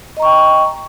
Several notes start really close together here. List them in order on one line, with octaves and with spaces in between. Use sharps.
D#5 A#5 C#6 G5